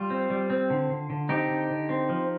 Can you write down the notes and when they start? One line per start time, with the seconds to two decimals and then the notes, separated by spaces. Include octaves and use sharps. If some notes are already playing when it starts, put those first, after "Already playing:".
Already playing: G3 F4
0.10 C4
0.30 G3
0.50 C4
0.70 D3
0.90 D3
1.10 D3
1.29 C4 D#4 G4
1.49 D3
1.70 D3
1.89 C4
2.09 F3